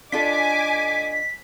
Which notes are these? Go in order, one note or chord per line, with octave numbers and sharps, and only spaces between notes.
D4 F4 A4 D#5 G#5 D6 B6